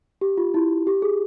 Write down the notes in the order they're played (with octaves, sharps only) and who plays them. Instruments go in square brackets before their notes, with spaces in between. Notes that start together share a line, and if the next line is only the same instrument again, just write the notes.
[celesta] G4
F4
E4
G4
G#4